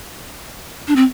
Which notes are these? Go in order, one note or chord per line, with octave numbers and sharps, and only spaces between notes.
D4
C4